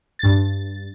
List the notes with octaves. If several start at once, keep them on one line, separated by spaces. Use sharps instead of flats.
G2 A6